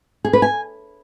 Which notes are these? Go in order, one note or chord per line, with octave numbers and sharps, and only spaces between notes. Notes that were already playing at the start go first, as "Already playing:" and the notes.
G#4
B4
G#5